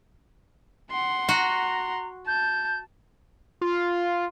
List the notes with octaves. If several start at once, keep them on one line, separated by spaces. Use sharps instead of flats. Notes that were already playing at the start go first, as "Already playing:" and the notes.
F#5 C6
F#4 A#5
A5 G6
F4